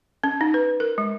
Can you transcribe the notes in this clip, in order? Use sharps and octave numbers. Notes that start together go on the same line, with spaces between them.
C#4
D#4
B4
A#4
G#3